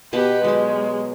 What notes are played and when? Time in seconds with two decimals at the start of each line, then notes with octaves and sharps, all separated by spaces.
0.13 B2 B3 G4 B4 A5
0.44 F#3 G#3 G4